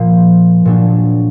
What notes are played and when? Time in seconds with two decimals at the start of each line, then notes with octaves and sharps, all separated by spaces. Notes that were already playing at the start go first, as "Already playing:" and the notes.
Already playing: A#2 F3 A#3
0.65 A#2 F#3 D4